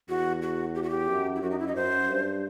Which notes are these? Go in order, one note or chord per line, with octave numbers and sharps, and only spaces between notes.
E2 F#4
F#4
G4
F#4
G4
F#2
E4
F#2 F#4
D#4
E4
D#5
F#2 C5
G2